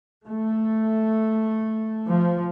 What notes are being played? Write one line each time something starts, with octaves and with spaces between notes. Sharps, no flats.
A3
F3